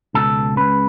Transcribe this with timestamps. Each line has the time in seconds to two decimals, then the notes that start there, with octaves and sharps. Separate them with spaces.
0.14 C#2 B2 A4
0.56 C#2 C#3 B4